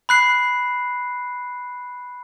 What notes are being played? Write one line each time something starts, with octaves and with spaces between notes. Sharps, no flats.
B5 F#6 C7